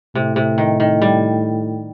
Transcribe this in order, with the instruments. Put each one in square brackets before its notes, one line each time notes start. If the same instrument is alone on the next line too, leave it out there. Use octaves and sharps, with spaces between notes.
[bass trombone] A2 [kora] C3
[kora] C3
D#3
D#3
G3